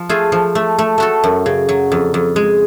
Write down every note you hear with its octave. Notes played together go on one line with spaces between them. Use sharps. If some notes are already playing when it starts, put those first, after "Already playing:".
Already playing: F3
A3 F4 G#4
F3
A3
A3
A3 F#4 A4
F#2
C#3
F#3
F2
F2
G#3